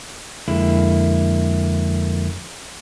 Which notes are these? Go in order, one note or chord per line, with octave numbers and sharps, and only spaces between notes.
F2 D3 G#3 A#3 E4